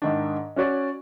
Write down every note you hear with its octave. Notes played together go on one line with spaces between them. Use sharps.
G#2 D#3 D4
C#4 F#4 C#5 D5